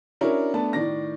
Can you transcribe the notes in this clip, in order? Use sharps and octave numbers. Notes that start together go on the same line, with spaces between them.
C#4 D4 E4 F#4 A#4 C#5
A3 B3 D4 A5
A2 D#3 D5 A#6